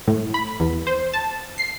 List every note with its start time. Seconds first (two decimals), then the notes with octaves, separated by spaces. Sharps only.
0.08 A2
0.34 B5
0.60 E2
0.87 C5
1.13 A5
1.58 C7